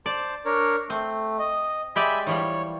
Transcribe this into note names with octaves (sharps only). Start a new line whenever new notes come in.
C5 D5 A5
D4 A#4 C#5
A3 C4
D#5
G#3 G4 D5 E5 G#5 B5
E3 F3 G3 C#5